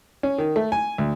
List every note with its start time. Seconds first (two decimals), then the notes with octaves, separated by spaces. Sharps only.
0.23 C#4
0.38 D#3
0.56 A3
0.72 G#5
0.98 D2